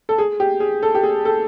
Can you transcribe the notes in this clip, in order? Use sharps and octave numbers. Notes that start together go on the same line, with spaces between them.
A4
G#4
G4
G#4
A4
G4
G#4
A4